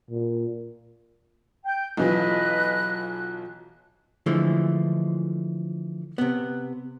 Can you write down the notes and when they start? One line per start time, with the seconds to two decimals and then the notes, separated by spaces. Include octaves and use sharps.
0.11 A#2
1.64 G5 G6
1.97 B1 E3 F4 B4 D#5 F#6
4.26 D3 E3 F3 G#3 A3
6.18 C3 B3